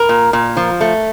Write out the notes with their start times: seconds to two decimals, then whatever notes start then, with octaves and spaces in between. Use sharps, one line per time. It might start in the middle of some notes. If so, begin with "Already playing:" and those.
Already playing: A#4
0.09 A#2
0.33 A#2
0.57 F3
0.81 A3